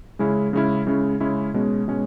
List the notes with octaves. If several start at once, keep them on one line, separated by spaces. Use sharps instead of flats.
C#3 G#3 C#4 E4
C#3 G#3 C#4 E4
C#3 G#3 C#4 E4
C#3 G#3 C#4 E4
B2 G#3 C#4
B2 G#3 C#4